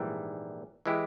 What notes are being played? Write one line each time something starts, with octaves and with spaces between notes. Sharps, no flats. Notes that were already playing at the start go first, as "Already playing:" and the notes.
Already playing: A#1 G#2 E3 G3
E3 G#3 E4 G4